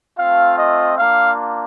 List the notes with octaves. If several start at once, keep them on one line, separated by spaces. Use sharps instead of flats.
A3 C4 F4 F5
D#5
A#3 D4 F4 F5